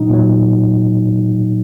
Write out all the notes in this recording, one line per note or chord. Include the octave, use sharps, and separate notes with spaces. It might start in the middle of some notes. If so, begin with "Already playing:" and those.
Already playing: A#2 F#3 D#4
A#2 F#3